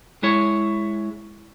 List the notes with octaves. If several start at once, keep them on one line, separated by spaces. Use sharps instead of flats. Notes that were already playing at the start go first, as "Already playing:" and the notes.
G#3 E4 C#5